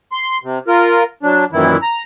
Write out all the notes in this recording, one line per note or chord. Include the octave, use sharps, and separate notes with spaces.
C6
C3
F4 A#4
F#3 D4
F#2 A#2 D#3 E3 E4
A#5